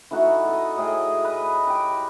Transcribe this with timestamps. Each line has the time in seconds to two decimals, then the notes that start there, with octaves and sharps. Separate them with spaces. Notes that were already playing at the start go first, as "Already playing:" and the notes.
0.11 E3 A3 D#4 F#4
0.49 A4 D#5
0.78 A2 G#4 D#5 G5
1.24 B4 D#5
1.67 G4 G5